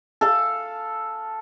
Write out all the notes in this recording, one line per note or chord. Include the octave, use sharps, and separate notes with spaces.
A4 F5